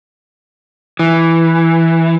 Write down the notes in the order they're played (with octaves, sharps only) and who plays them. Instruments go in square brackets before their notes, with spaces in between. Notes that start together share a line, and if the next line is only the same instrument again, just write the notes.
[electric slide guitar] E3